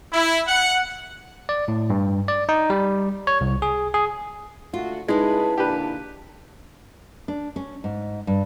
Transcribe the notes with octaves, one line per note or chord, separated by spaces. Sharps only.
E4
F#5
D5
A2
G2
D5
D#4
G3
C#5
C2
G#4
G#4
D3 A3 F4 F#4
C#3 G#3 D#4 E4 G#4 B4 A5
A#2 D3 D4 G4 B4
D4
C#4
G#2
G2